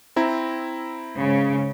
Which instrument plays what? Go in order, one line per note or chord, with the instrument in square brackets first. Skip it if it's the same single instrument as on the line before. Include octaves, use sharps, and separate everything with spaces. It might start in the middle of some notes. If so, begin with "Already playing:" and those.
[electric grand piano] C4 E4 A#5
[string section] G#2 C#3